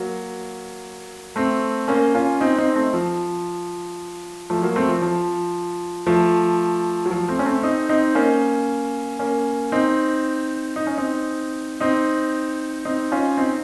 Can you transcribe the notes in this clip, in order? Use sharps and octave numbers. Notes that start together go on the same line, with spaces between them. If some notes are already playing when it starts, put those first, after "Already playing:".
Already playing: F#3 A#3
A3 C4
A#3 C#4
C#4 F4
C4 D#4
C4 D#4
A3 C4
F3
F3 A3
F#3 A#3
A3 C4
F3
F3
F3 A3
F#3
F3
A3 C4
C#4
A3 C4
C4 D#4
C4 D#4
A#3 C#4
A#3 C#4
C4 D#4
D#4
C#4
C4 D#4
C4 D#4
C4 D#4
C#4 F4
C4 D#4